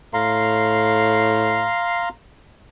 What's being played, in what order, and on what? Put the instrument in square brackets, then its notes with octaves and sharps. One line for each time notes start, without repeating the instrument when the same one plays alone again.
[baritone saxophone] A2 [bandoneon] F5 A#5 C6